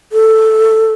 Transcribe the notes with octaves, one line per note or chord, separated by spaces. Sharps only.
A4